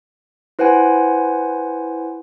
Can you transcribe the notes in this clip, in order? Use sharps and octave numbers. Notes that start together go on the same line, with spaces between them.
E4 B4 C5 F#5 G#5